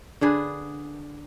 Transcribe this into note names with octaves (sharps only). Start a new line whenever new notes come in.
D3 D4 G#4 B4